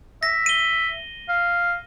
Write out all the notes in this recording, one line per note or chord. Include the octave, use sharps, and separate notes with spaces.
E5 A#6
D#7 G7
F5